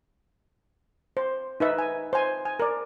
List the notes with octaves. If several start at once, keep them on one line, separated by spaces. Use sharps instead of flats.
C5
D#4 B4 E5
G#5
C5 G#5
G#5
A#4 D5